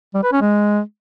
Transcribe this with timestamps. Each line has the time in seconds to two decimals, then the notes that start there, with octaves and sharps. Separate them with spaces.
0.14 G3
0.23 B4
0.32 C#4
0.41 G#3